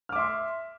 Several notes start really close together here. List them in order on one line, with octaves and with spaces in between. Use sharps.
F6 D6 E5 C6